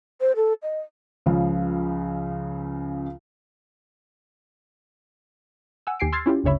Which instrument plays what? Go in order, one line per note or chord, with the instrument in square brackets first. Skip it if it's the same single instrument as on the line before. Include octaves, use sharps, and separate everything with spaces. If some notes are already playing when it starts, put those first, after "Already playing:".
[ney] C5
A4
D#5
[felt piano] C#2 C#3 F3
[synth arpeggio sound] F#5 G#5 E6
D#2 G4 G#5 C7 D7
C6 E6 F6 G#6 A6 C7
C#4 E4 F4 G4
G1 D2 C#3 C#5 E5 B5